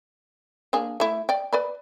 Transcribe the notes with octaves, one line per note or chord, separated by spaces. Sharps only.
A#3 D4 G#4
A3 E4
D5 G5
B4 D5 B5